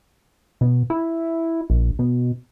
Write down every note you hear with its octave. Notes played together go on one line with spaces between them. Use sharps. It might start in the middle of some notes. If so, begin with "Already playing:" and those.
B2
E4
A#1
B2